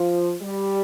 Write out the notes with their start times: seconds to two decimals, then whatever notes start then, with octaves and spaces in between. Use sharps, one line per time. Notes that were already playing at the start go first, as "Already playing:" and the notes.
Already playing: F3
0.42 G3